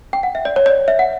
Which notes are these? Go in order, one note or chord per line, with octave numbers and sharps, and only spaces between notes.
G5
F#5
E5
D5
C#5
D5
E5
F#5